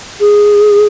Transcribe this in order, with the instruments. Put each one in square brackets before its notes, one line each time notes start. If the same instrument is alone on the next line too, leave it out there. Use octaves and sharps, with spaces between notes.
[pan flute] G#4